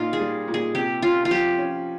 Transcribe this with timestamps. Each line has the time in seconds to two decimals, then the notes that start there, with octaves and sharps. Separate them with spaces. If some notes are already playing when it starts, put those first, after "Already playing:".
Already playing: A#2 D#4 F4
0.13 G#4
0.20 G3
0.48 A#2
0.54 G#4
0.75 C3 G4
1.02 C#4 F4
1.25 F4
1.31 F3 G4
1.58 C#4